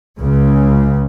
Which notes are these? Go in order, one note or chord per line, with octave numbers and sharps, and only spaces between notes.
C#2 C#3